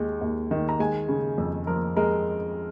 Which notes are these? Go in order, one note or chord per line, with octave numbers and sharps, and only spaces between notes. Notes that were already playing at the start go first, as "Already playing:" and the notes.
Already playing: D#2 G#3
D#2
D#3
A#5
G#3 G#5
C#3
F2
F3 A#4
G#3 A#4